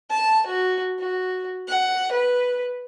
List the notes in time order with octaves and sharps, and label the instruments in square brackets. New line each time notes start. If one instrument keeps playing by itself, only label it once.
[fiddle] A5
F#4
F#4
F#5
B4